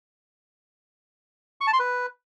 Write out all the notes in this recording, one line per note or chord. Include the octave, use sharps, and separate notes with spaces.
C#6
A5
C6
B4